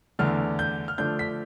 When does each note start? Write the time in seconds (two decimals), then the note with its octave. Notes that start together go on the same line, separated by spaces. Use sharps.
0.19 E2 D3 A3 D4 F6
0.59 G6
0.88 F6
0.98 D3 F3 A3 D4 G6
1.19 B6